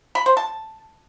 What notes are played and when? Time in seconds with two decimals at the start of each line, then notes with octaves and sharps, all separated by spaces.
0.15 B5
0.26 C5
0.37 A5